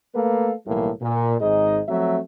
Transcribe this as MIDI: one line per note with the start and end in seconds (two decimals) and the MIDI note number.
0.15 0.53 57
0.15 0.53 58
0.15 0.53 69
0.15 0.53 71
0.15 0.53 77
0.66 0.89 35
0.66 0.89 45
0.66 0.89 52
0.66 0.89 55
0.66 0.89 58
1.01 1.35 46
1.39 1.81 32
1.39 1.81 44
1.39 1.81 63
1.39 1.81 68
1.39 1.81 75
1.89 2.19 53
1.89 2.19 54
1.89 2.19 57
1.89 2.19 60
1.89 2.19 76